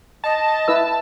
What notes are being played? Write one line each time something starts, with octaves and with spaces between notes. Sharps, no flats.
D#5 A5
E4 B4 E6